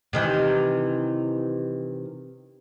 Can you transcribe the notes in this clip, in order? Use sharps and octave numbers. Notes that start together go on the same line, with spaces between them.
C3 D#3 E3